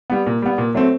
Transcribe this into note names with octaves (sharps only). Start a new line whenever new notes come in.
G3 B3
A#2
G3 B3
A#2
F#3 A3 C4